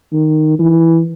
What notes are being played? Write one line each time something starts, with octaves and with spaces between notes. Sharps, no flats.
D#3
E3